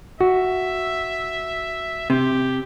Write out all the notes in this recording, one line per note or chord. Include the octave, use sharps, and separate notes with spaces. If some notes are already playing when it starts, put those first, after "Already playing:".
F#4 E5
C3 G4